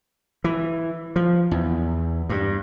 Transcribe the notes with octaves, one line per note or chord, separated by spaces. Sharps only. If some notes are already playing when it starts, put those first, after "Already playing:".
E3
F3
E2
G2